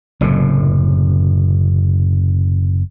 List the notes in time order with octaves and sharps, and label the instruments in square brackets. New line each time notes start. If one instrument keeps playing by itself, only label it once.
[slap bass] F#1 F#2 A2 C3